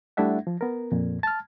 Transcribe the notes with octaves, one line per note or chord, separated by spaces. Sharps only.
G3 A3 D4 E4 E5 F#5
F3
B3 A#4
F2 A#2
A5 F6